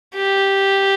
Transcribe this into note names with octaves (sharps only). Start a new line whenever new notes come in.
G4